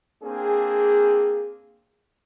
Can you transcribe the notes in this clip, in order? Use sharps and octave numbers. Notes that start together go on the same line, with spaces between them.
A#3 C4 D4 G#4